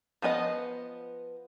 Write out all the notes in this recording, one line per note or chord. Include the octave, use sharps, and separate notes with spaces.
F3 B3 B4 D#5